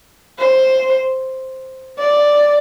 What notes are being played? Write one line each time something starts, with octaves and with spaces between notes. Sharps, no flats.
C5
D5